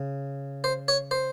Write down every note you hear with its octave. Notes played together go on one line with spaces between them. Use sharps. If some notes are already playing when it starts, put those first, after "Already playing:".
Already playing: C#3
C5
C#5
C5